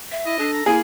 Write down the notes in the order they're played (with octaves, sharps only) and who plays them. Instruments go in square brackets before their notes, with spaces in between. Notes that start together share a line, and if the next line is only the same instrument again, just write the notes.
[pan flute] E5
[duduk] E4 [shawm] D#5
[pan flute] D4 [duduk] A4
[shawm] A#5
[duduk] A#3 [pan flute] E4 [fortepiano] G#4 [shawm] G#5